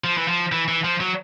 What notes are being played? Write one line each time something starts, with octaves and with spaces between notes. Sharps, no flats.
F3
E3
F3
E3
E3
F3
F#3